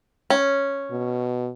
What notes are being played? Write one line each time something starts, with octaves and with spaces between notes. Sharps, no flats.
C#4
B2